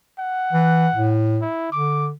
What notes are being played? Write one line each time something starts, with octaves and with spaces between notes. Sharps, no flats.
F#5
E3
A2
E4
D3 D6